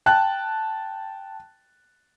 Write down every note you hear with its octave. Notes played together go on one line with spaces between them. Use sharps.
G5 A5 F#6